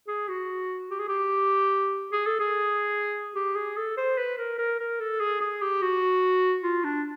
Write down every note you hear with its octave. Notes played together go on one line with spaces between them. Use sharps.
G#4
F#4
G4
G#4
G4
G#4
A4
G#4
G4
G#4
A4
C5
B4
A#4
A#4
A#4
A4
G#4
G#4
G4
F#4
F4
D4